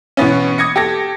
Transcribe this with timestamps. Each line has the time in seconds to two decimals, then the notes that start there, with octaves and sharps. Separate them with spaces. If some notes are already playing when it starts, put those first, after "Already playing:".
0.17 B2 E3 B3 C#4
0.58 D#6 G#6 A#6 C#7
0.76 G4 A4 A#6